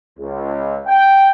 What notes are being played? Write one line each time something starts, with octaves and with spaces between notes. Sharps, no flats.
C#2
G5